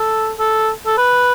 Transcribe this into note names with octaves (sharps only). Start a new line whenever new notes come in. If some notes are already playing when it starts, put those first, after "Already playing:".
Already playing: A4
A4
A4
B4